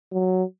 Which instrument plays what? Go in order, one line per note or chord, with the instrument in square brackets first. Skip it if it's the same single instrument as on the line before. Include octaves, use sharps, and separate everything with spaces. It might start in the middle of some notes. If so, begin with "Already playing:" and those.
[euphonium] F#3